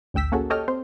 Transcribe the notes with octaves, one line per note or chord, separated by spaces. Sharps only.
A1 D2 G5 E6 B6
A#3 C#4 F#4 G#4 A4
G4 A4 C#5 D#5 G5 F6
C4 C5